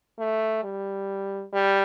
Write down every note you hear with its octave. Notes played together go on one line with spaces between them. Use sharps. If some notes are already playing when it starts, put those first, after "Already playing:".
A3
G3
G3